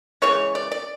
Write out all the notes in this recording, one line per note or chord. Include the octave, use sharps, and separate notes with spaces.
C#3 E3 G#3 C#5
D5
D5